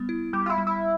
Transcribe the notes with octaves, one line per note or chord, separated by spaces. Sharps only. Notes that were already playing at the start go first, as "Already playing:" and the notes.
Already playing: G3 B3
E4
G3 G4
F4
E4
G3
E4